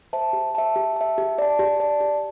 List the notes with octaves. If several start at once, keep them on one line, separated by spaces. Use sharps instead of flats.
C5 E5 A5
G4
E5 A5
G4
E5 A5
G4
D5 A5
G4
D5 A5
G4